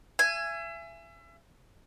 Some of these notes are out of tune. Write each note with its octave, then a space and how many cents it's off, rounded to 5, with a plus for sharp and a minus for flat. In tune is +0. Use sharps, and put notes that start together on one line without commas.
E5 +35 G#5 +0